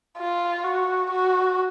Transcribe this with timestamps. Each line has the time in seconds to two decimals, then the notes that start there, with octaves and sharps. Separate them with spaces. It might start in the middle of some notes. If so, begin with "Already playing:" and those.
0.19 F4
0.64 F#4
1.10 F#4